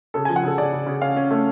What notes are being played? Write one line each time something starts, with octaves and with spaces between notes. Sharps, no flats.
C#3 A4
G#5
F3
F#5
C#3 A4
C#3 D5
C#3
C#3
C#4 F5
C#4
A3